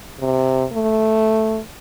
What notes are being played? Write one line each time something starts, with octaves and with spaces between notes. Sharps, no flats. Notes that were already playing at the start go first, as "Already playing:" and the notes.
C3
A3